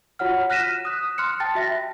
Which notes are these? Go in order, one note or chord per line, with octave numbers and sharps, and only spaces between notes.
F4 F#4 C#5 F#5 F6
F6 F#6 A#6 B6 D#7 E7
D#6 F#6
C6 F6 F#6 C#7
G5 A5 A6
F#4 E5 A#6